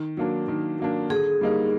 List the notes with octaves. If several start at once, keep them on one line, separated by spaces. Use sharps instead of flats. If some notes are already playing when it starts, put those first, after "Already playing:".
Already playing: D#3
F#3 A#3 D4
D#3
F#3 A#3 D4
D3 G#4
G3 A#3 D#4